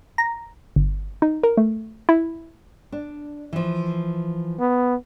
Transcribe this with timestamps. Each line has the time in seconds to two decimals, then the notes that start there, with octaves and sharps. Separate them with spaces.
0.18 A#5
0.76 G1
1.22 D#4
1.43 A#4
1.57 A3
2.09 E4
2.92 D4
3.53 E3 F3
4.60 B3